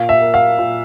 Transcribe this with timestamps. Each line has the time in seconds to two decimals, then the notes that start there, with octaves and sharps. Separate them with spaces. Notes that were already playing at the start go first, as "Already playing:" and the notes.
Already playing: A#2 F5
0.09 E5
0.21 A#3
0.34 F5
0.58 A#2